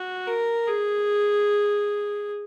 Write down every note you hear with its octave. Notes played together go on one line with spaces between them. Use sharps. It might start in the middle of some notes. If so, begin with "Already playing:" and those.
Already playing: F#4
A#4
G#4